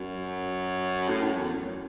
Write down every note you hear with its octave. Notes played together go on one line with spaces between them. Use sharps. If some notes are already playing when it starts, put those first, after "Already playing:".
Already playing: F#2
A2
F#2
E2
F#2